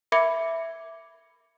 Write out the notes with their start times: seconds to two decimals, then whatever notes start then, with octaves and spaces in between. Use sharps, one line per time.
0.12 A#4 E5 B5 D6 G#6 C#7